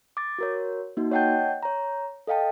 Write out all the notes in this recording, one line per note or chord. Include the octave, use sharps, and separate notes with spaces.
D6 A6
F#4 A#4 C#5
A#3 D#4 F#4
C#5 D#5 F#5 G5 A5 G6
C#5 A#5
A4 D#5 F5 G5 A5